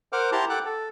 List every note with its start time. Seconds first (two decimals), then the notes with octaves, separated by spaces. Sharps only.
0.13 A#4 C5 F#5 D6 F6
0.32 E4 G4 A5 A#5 C6
0.49 A4 F#5 G5 D6 F#6
0.65 A4